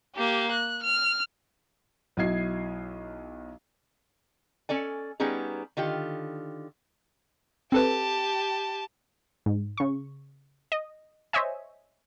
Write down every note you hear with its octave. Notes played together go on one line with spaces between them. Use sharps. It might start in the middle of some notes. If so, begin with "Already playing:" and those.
A#3 G4
F#6
F6
B1 F#3 E4 D#5 G#6 C7
C#4 A4 D5 G#5
G3 B3 C#4 D#4 G#4
D3 D#3 F4 G4
C4 G4 A4 B4 A5
G#2
C#3 C#6
D#5
C5 C#5 D#5 E5 G#5